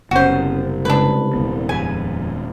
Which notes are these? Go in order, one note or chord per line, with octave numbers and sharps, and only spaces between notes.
F#1 C2 B3 C#4 F#4 C5
C#3 G#3 D4 B4
D#1 F#2 B3
F2 G#4 B4 G#5